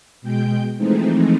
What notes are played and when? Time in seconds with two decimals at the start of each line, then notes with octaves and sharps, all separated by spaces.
0.22 B2 G#3 G5 G6
0.78 E3 F3 G#3 A3 C4 D#4